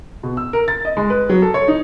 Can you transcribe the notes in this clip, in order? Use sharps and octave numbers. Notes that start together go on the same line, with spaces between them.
B2
E6
A#4
A6
D#5
G#3
B4
F#3
A4
C#5
D#4